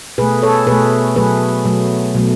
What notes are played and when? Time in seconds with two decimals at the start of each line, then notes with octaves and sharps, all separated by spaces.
0.18 B2 A3 G#4 B4
0.42 A4 C#5
0.67 B2 A3 G#4 B4
1.16 B2 F#3 A3 G#4 B4
1.65 B2 F#3 A3
2.15 B2 F#3 A3